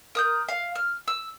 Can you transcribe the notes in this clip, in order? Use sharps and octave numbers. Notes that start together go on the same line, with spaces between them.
A#4 D#6 G6
F5
F6
E6